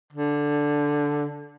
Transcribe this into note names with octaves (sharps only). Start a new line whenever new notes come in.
D3